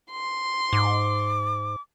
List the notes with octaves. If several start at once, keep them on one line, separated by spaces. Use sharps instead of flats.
C6
G#2 D6